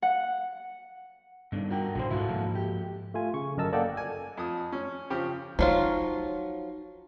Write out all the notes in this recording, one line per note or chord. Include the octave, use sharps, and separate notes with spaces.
F#5
G2 B2 D3 D#3
F#4 A#4 G5
A#1 D3 E3 F#3 C5
D1 G#2 E4 F#4 A4
G#2 F3 A#3
G4
A3 F4 G#5
C#3 C#6
G1 F#2 A#4 D#5 A5 E6
A#3 A4 D5 D#5 F#5 G5
G#5
F2 D#6
C#4
C#3 F3 G4
F3 F#3 D#4 F4